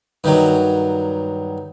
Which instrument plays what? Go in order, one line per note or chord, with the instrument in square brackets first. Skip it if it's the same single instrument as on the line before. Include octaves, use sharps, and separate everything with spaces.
[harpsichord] G2 D#3 F#3